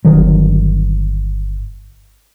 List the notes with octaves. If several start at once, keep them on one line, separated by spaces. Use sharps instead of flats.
G1 D#3 F#3